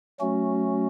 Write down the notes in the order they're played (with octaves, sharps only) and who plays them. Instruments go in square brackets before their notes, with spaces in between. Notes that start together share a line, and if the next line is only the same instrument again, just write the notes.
[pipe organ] F#3 A3 C#4 F#4